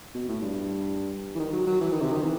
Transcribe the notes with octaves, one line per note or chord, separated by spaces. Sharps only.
B2
A2
G2
E3
D#3
F#3
F#3
E3
D#3
C3
D#3
E3